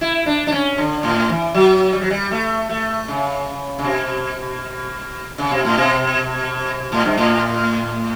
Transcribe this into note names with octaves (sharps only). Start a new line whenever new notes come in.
E4
D4
D4
C#4
D3
A2
E3
F#3
G3
F#3
G3
A3
A3
C#3
C#3
B2
C#3
B2
A2
B2
A2
G2
A2